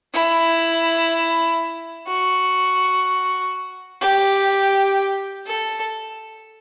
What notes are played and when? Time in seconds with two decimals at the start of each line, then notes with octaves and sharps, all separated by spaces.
0.14 E4
2.07 F#4
4.01 G4
5.47 A4